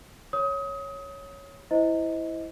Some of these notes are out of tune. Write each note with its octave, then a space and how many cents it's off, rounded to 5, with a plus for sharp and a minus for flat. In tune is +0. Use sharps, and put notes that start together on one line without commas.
C#5 +0 D#6 +30
E4 +0 C5 -20 D#5 +20